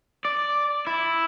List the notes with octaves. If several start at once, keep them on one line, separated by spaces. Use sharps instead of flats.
D5
E4